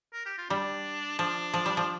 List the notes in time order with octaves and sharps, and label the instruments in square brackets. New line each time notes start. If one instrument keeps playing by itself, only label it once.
[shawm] A#4
G4
F4
[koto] G3 [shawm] D4
[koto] F3 [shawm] D4
[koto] F3
G3
F3